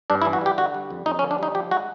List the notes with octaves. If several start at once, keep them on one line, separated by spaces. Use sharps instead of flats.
G2 D4
E4
E3
F#4
G3 G4
D3 F#4
G3
F2
F2 D#4
C#4
D3
D4
G3 D#4
F3 G4
G#3 F#4